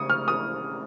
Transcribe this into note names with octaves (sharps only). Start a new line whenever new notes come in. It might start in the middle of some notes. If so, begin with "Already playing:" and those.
Already playing: C#3 C#6 D#6
F6
D#6